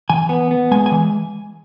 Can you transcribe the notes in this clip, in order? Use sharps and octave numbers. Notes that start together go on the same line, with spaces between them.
E3 G#5
B3
B3
G#3 G#5
G#5
E3